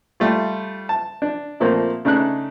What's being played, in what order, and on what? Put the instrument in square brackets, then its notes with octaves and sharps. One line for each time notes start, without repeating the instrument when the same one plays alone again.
[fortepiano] G3 A3 F4
A5
D4
A#2 F3 A3 A#3 C4
C#3 A3 D4 D#4 F#6